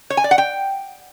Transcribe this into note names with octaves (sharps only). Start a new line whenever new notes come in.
C#5
G#5
D5
F#5
G5